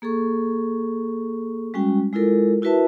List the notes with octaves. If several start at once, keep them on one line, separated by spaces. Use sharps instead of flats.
A#3 G#4 A4 C#6
G3 G#3 C#4 F#4 G5
G#3 E4 F4 A4 A#4
E4 F#4 A#4 B4 E5 A5